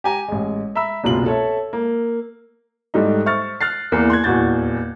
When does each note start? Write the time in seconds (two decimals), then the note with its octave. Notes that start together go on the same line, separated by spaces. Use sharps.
0.04 G4 G#5 A#5
0.28 A1 G#3
0.75 E5 A#5 B5 E6
1.04 F#1 C2 B2 F4 F#7
1.26 A4 C#5 E5
1.73 A#3
2.94 G#2 G3 A3 D#4
3.26 C5 E5 C#6 F6 A6
3.61 F6 F#6 A6 C7
3.92 E2 E3 A#3
4.10 C6 F#6 G#6
4.24 D#1 E2 F#4 G6 A6